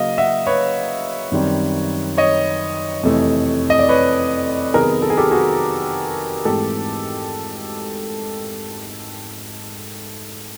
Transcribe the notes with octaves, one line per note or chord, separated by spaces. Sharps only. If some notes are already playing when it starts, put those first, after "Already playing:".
Already playing: C#3 F#3 A#3 D#5 F5
E5 F#5
B4 C#5
F#2 D#3 G3 C4
C#5 D#5
F2 C3 E3 A3
D#5
D5
B4 C#5
C3 D#3 F#3 B3 G#4 A#4
A4
G#4
G4 A4
F#4 G#4
G#2 E3 A3 C4 G4 A4